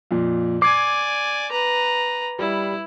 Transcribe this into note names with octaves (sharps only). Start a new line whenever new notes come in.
F2 A#2
D5 G#5 D6 G#6 C7
B4 A#5
G3 E4